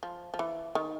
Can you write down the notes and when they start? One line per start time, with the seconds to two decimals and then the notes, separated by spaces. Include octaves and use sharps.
0.03 F3
0.34 F3
0.39 E3
0.75 D#3